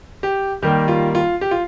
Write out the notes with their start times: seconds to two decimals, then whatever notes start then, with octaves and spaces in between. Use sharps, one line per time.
0.23 G4
0.62 D#3 G3 A#3 G4
0.88 F4
1.15 F4
1.41 G4
1.51 F4